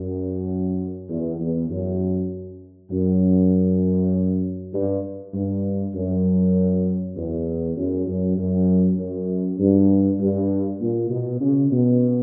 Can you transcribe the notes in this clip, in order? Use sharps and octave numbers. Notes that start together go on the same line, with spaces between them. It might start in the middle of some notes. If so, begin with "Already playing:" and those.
Already playing: F#2
E2
E2
F#2
F#2
G2
G2
F#2
E2
F#2
F#2
F#2
F#2
G2
G2
A#2
B2
C#3
B2